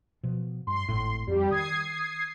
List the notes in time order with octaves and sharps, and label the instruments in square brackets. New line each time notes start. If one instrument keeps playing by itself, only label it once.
[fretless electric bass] B2 F3
[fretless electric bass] G2 [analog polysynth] C6
[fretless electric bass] G#1 A2 [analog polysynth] C6
[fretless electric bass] F2 [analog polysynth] G3 G4
[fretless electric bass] D#3 [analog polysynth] D#6 G#6 C7